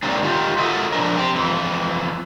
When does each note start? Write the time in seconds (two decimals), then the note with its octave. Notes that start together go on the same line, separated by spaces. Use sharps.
0.03 D#3 G3 A#3 C4 D4
0.22 D#3 F4 G4
0.58 F4 F#4 A4 A#4 D#5 E5
0.93 C#3 F3 D4 A#4
1.17 C4 G4
1.34 F2 E3